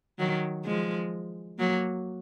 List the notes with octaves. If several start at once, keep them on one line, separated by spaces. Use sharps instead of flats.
D#3 F#3
F3 G#3
F#3 A#3